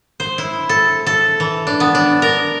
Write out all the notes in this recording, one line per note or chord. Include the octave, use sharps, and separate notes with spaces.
C5
E4
A4
A4
E3
D4
B3
D4
A#4